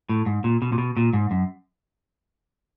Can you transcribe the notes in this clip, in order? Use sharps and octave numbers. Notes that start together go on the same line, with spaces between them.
A2
G#2
A#2
B2
A#2
B2
A#2
G#2
F#2